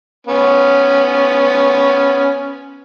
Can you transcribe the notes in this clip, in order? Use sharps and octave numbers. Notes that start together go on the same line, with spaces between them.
B3 C#4